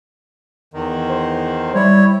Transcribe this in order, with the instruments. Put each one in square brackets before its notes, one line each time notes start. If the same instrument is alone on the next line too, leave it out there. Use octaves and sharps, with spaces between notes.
[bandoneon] E2 D#3
[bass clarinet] C5
[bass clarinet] G3 [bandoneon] E4 C#5